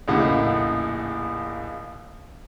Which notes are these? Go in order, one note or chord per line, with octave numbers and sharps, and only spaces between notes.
A#1 D#2 A2 C#3 F#5